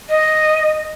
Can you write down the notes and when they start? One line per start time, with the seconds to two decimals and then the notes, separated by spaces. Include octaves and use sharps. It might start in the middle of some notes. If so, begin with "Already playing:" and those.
0.10 D#5